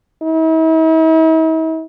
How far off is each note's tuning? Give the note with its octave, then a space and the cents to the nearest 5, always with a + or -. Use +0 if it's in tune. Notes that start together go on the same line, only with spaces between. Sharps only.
E4 -45